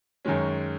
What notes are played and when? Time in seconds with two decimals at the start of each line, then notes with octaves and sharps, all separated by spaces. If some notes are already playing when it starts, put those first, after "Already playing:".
0.25 F#2 D#3 G#3 C#4